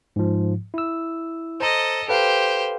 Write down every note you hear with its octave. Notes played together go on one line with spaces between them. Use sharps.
G#2 F3
E4 E6
A4 C5 D#5 A#5
G4 A4 B4 C5 F5